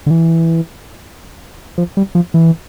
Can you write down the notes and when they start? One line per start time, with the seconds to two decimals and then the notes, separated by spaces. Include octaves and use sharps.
0.06 D3
0.11 E3
1.78 F3
1.97 G3
2.15 F3
2.34 E3